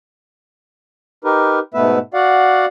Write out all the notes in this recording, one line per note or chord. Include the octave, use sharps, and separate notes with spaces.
D#4 G4 A#4 B4
G#2 B2 A3 B3 B4 E5
F#4 D5 F5 F#5